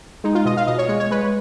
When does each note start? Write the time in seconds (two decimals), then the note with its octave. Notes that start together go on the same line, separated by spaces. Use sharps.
0.24 G#3 D#4
0.35 F4
0.45 B2 D#5
0.57 F5
0.67 B2 D#5
0.78 C#5
0.89 G#3 C#5
1.00 C#5
1.11 G#3 B4